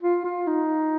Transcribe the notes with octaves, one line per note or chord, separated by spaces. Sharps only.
F4
F4
D#4